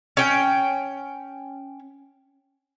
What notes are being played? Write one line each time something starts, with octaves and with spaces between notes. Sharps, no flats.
C#4 G5